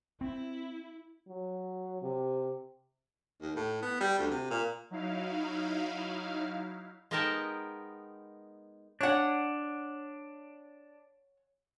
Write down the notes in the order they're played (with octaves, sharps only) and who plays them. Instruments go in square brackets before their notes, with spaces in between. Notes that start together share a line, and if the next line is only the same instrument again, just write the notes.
[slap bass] C4 [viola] E4
[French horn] F#3
C3
[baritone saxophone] D#2
A2
B3
G3
D2
C3
A#2
[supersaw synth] F#3 D#4 E4 F5
[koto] G#3 B3 D#4 A#4 G5 A5
[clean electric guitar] D4 [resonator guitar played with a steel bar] C#5 F#5